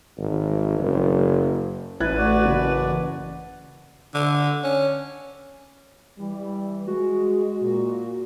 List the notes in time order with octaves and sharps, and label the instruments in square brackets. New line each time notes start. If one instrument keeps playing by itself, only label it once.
[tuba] G#1
F#1
[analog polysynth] A1 [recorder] B4 [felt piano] F#6 G#6 A6
[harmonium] F#4 D5
[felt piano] F#1
[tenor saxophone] D3
C#4
[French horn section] E3 G3
[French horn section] G#3 [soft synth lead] F#4
[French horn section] A#2